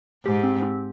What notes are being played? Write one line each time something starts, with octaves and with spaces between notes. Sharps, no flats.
G#2 G4
C4
C4